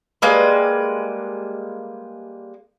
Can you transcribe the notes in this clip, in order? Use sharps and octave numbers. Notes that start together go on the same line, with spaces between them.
G3 G#3 A#3 B4